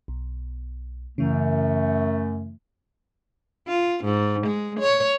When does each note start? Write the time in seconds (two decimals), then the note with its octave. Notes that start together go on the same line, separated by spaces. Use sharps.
0.08 B1
1.18 F#2 C#3 E3 A3
3.68 F4
4.05 G#2
4.47 G#3
4.80 C#5